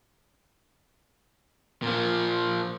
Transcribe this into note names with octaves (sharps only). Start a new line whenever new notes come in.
A#2 F3